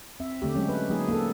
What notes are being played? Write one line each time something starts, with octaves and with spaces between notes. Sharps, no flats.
C4 E5
D3 A3 G4
F#3 G#3 C#4
B4
F#3 A#3 D#4 G#4
A#3 A4